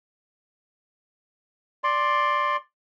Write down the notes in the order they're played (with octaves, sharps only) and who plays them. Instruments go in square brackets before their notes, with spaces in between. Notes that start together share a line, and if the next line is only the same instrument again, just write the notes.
[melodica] D5 C6